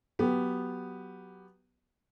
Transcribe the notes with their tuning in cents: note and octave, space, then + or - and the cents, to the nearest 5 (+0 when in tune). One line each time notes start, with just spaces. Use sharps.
F#3 +0 B3 +0 G4 +0